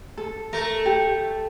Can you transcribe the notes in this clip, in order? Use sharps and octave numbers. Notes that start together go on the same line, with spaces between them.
A4
A3 A#4
G4